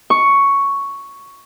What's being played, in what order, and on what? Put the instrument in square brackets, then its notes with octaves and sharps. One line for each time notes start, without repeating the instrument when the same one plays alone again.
[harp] C#6